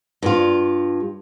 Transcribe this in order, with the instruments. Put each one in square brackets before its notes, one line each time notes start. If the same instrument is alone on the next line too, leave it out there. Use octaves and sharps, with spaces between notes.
[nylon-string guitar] G2 F4